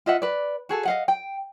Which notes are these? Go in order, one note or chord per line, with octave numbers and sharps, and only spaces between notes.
F4 D#5 E5 F#5
B4 D5
F#4 G#4 A4
D#5 F5 F#5
G5